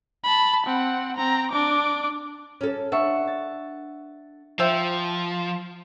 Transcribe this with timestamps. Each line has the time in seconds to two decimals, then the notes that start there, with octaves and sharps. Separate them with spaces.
0.24 A5 B5
0.67 C4 F#5
1.17 C4 A#5
1.52 D4 D6
2.61 C#4 A4
2.92 D4 E5 F#5 C#6
3.27 A6
4.59 F3 C5 E5 G5